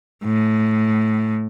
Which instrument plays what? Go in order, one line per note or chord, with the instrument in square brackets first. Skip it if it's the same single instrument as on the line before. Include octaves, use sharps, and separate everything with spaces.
[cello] A2